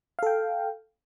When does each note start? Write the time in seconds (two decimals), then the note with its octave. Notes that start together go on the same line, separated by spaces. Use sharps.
0.19 F5
0.23 A4
0.27 G5